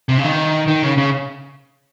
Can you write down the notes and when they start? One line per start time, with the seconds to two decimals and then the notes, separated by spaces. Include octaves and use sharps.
0.09 C3
0.18 C#3
0.24 D#3
0.68 D#3
0.83 C#3
0.98 C#3